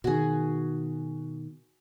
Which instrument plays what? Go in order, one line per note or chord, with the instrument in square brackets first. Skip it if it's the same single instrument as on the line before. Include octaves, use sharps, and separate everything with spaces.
[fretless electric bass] B2 D#3 [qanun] F#4 G#4